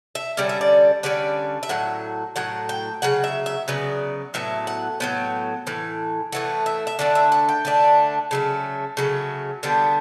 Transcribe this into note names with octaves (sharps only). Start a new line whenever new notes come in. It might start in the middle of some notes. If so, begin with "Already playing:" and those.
E5
D3 G3 C#4 D5
E5
D5
D3 G3 C#4 D5
E5
A2 F#3 F#5
A2 F#3 F#5
G5
C#3 F#3 F#5
E5
E5
C#3 F#3 B3 D5
A2 F#3 B3 E5
F#5
A2 F#3 B3 G5
A2 E3
A2 E3 A3 F#5
E5
E5
D3 A3 D4 D5
E5
F#5
G5
D3 A3 D4
C#3 F#3 A3
C#3 F#3 A3
D3 G3 B3 D4